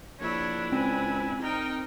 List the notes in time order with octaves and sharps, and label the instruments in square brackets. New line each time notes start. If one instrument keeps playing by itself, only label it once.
[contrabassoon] A#1 [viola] D4 E4 [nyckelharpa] C#5
[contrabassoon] C#2 [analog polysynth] C4 [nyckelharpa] G#5
[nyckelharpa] D#4 [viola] A#4 G5